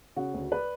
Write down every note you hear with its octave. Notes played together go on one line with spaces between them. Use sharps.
C#3 F#4
D2
B4 D5